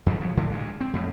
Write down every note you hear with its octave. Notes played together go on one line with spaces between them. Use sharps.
F2 G#2 D#3 F3
F2 F3 F#3
A2 D3 E3 F3
D2 G#3
C4
F2 A2